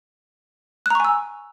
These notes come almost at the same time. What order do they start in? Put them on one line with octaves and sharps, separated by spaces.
F#6 A#5 C#6 G#5 E6